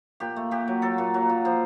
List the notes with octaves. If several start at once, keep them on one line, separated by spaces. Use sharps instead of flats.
A#2 G4
A3
A#2 G4
F#3
F#3 A4
A#2
F#3
A#2
F3 C5